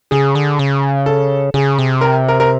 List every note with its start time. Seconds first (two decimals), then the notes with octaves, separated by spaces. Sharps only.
0.11 C#3 G#4
0.35 D3
0.59 C#3
1.06 A4
1.54 C#3 G#4
1.78 C3
2.01 A#4
2.28 A#4
2.40 A#4